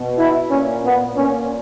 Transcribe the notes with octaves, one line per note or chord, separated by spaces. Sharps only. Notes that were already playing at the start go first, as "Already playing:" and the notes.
Already playing: B2
E4
A#2 C#4
B3
A#2 C#4